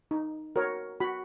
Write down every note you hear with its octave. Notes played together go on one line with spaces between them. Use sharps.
D#4
F#4 A#4 C#5
F#4 B5